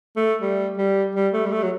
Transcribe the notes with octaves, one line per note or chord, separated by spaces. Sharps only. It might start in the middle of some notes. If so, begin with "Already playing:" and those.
A3
G3
G3
G3
A3
G3
A3
F#3